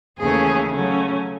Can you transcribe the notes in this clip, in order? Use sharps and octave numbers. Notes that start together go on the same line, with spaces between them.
D#2 C#3 E3 A3 C#4 G#4
C#3 F#3 A3 C#4